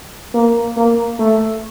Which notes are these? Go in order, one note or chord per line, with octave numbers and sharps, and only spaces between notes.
A#3
A#3
A3